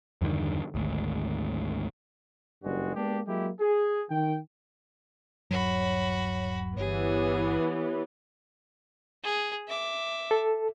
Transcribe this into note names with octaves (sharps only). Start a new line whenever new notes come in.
E2 G2 D3 D#3
G#1 D2
F#1 G2 G3 G#3 F#4
G#3 A#3 B3 D4 G4
F#3 G#3 A#3 E4 G4
G#4
D#3 G5
D#1 G2 F#3 F#4 C#5 B5
G1 E3 B3 G4 G#4 C#5
G#4
E5 D6
A4